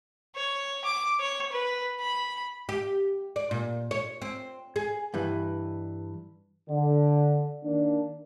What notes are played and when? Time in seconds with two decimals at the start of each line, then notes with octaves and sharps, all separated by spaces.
0.35 C#5
0.84 D6
1.20 C#5
1.52 B4
2.00 B5
2.69 G4
3.36 D5
3.51 A#2
3.91 C#5
4.22 C4
4.76 G#4
5.14 G2 E3
6.70 D3
7.64 D#3 A#3 D4